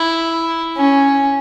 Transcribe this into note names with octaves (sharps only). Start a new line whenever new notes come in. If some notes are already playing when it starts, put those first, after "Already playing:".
Already playing: E4
C#4